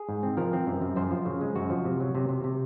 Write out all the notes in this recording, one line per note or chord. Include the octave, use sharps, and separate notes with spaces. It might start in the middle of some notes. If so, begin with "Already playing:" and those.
Already playing: G#4
G#2
C4
F3 A#4
C4
F#2
F#2
F#2 C5
F3
C#3
G#3
F#2 F#4
F3
C3
F#3
C3
C3
C3